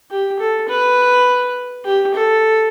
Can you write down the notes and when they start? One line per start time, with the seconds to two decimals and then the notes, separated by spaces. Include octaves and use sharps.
0.10 G4
0.39 A4
0.68 B4
1.85 G4
2.14 A4